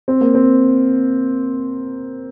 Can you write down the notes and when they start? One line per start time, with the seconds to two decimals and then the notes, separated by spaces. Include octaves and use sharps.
0.08 C4
0.21 A#3
0.35 C4